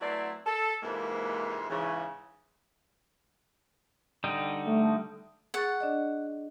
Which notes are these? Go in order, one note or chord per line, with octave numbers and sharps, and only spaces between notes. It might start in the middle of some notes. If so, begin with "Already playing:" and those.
F#3 A3 B3 C4 E4 D5
A4
F2 G#2 C3 E3 G#3 A#3
G#2 C#3 E3
D3 G3 D#4
A3
G#4 F#5 C#6 A6
D4 D5 D#5